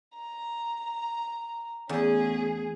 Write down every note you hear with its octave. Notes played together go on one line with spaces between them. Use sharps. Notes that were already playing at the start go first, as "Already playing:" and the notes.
A#5
E2 A3 C#4 G#4